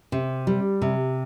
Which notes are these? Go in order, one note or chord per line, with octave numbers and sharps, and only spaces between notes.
C3
G3
C3